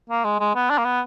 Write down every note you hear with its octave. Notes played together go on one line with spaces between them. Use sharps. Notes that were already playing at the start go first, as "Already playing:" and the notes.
A#3
G#3
G#3
B3
D4
A#3
B3